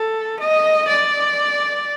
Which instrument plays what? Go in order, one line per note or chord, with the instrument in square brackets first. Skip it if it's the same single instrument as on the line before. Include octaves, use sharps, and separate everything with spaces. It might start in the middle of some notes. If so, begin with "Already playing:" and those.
Already playing: [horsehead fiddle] A4
D#5
D5